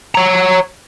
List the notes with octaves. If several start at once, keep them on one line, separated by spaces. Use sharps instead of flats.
C#5 A#5